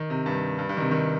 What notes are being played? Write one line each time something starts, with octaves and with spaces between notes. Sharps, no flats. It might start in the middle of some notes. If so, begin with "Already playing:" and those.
Already playing: D#3
C3
G2
G2
G2
D#3
C3
D#3